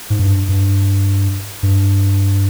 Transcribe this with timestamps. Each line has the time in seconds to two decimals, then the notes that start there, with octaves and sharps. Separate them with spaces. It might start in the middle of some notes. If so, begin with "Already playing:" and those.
0.10 G#2
0.19 G2
0.49 G2
1.63 G2